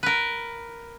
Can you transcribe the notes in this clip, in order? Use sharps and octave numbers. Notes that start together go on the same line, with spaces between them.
A#4 B4